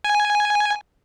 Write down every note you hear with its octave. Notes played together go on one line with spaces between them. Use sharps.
G#5